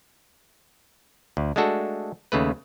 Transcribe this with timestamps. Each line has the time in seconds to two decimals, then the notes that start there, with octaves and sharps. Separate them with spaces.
1.37 D2
1.56 G#3 A3 D4 F#4 A4
2.32 D#2 C#3 A3 B4